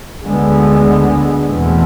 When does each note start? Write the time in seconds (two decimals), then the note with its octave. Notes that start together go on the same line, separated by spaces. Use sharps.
0.24 D2 D3 G#3 B3
1.49 E2 B2 A3 C4